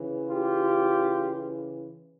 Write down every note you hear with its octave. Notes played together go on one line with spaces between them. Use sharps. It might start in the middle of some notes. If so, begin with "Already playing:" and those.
Already playing: C#3 E3
F4 G4